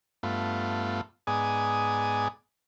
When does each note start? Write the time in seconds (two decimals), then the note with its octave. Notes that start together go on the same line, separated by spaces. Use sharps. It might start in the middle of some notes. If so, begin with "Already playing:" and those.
0.23 G2 A3 B3 F4
1.27 G#2 B3 G#4 D5 G#5 D#6